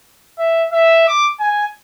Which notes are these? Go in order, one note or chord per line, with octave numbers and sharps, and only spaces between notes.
E5
E5
D6
G#5